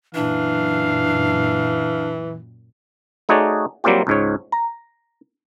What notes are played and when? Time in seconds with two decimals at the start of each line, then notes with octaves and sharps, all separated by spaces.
0.15 F#2 A#2 E3 D4 F5
3.29 A3 D#4 F#4 G#4 C#5 D5
3.84 F#3 G3 A#3 C4 F4 G4
4.07 C#2 G#2 C#5
4.52 A#5